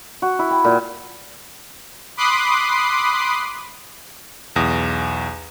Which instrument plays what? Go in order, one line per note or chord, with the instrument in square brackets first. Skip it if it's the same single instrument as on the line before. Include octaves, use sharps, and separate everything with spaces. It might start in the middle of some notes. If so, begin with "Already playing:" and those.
[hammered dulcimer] F#4
E4
G5
A#2
[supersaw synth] B5 C6 D6 D#6 F#6 C7
[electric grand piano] B1 E2 D#6 A#6